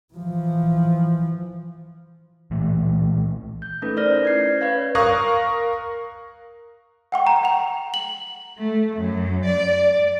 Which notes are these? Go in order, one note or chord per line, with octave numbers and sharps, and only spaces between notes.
E3 F3
A#2 E3 A3
G6
A3 C#4 D#4 A4 B4
E4 A#4 C5 D5 F6 A#6
C#4 G#6 C7
B4 C#5 F5 G#6
A#4 F5 C#6 D#6 F#6 A#6
F#5 G5 C#6
A#5
F#5 G5 F7
F#7
A3
F#2
D5